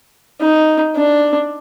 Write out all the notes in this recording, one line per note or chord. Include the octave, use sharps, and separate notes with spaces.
D#4
D4